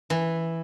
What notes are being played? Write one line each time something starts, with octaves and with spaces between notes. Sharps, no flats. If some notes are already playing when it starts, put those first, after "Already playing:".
E3